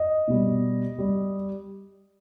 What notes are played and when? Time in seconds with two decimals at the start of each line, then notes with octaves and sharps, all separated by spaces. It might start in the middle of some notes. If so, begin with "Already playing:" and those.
Already playing: D#5
0.28 B2 G3
0.98 G3